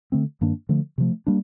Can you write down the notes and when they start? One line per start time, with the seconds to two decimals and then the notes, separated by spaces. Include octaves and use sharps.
0.12 D3 A3 C4
0.41 G2 D#3 A#3 D4
0.69 D3 F3 A3
0.98 C3 F3 A3
1.27 G3 A#3 D4